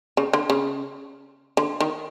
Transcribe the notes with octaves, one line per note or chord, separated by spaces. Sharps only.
C#3
D3
C#3
D3
D#3